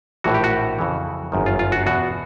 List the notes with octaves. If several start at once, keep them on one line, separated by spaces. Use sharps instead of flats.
A#1 A2 E3 F#4
G4
F#4
F2 C#3 E3
G1 F#2 D#3
F4
F4
F#4
E2 B2 F#4